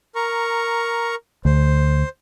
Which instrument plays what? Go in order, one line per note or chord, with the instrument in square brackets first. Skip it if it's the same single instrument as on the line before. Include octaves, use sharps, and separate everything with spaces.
[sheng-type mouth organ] A#4 A#5 C#6
[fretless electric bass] D2 [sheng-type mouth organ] C5